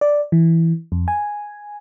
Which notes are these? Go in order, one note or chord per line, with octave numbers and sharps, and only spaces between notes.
D5
E3
F2
G#5